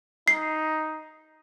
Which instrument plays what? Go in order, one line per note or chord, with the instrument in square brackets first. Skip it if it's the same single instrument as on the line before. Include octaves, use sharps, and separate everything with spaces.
[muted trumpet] D#4 [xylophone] C7